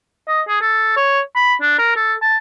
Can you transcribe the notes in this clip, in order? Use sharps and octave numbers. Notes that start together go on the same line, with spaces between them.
D#5
G#4
A4
C#5
B5
D4
A#4
A4
A5